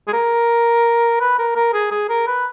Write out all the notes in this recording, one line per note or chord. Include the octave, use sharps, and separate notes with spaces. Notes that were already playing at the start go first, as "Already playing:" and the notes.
G#4
A#4
B4
A#4
A#4
G#4
G#4
A#4
B4